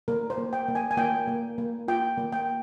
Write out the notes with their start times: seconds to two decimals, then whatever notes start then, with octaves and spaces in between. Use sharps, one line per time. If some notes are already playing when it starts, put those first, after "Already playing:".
0.08 A#3 A#4
0.30 C5
0.38 A#3
0.53 G5
0.68 A#3
0.75 G#5
0.91 G#5
0.97 A#3 G5
1.28 A#3
1.58 A#3
1.88 F4 G5
2.18 A#3
2.32 G5